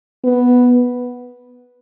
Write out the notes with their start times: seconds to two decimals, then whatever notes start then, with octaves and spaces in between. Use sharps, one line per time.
0.24 B3